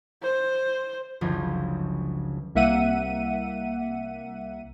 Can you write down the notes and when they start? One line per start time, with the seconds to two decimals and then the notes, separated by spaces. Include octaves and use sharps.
0.23 C5
1.21 F#1 C#2 D3 F3 F4 G#6
2.55 C2 A#3 E5 F#5 D#7